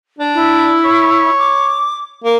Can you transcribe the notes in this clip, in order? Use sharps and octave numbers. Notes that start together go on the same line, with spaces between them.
D4
E4
C#5
D6
A#3